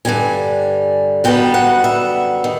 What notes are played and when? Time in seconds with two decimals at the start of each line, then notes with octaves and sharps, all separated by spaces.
0.05 G2 D3 G3 G#5
1.24 F#2 D3 G3 B3 G5
1.54 F#5
1.84 E5
2.44 D#3